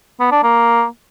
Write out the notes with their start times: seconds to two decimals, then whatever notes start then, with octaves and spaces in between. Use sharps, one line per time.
0.20 B3
0.32 D4
0.43 A#3